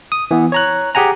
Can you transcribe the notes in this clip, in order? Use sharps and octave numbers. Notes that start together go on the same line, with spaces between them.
D#6
E3 B3
C#5 A#5 F#6
G4 G#4 F#5 G#5 A#5